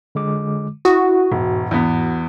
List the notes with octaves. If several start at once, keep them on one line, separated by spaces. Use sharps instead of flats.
D3 G#3 D6
E4 F#4 D#6
E1 G#2
E2 B3